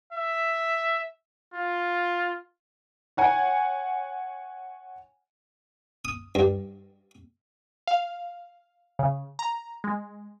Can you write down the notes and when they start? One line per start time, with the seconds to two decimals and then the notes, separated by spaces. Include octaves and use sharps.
0.12 E5
1.54 F4
3.17 C#5 F#5 G#5
6.05 D#6
6.35 G2
7.87 F5
8.99 C#3
9.39 A#5
9.84 G#3